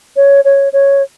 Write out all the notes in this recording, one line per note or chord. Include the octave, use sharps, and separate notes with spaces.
C#5
C#5
C#5